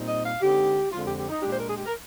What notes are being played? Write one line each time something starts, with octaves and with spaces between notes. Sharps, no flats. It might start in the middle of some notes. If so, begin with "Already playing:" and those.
Already playing: A#2 G3 C4 D#4
D#5
F5
D3 G#3 C4 D#4 G4
F2 D3 G#3 C4 F4
G4
G4
D#4
A#2 G#3 D4 G4
C5
A#4
G#4
G4
A#4